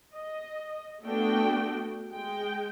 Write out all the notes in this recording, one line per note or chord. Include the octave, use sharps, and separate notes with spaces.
D#5
A3 B3 D4 F#4 A4 G5
G#3 G5